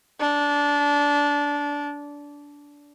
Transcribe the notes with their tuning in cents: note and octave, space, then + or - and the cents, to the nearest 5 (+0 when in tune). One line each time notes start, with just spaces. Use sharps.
D4 -20